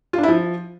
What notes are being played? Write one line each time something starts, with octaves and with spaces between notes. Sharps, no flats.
F4
D4
E4
F3